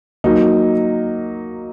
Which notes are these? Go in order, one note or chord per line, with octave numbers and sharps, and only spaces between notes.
F#3 A#3 D#4